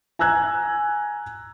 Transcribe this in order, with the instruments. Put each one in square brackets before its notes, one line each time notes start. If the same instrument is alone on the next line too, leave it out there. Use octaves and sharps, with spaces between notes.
[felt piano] G#5 A#5 E6 F#6 G#6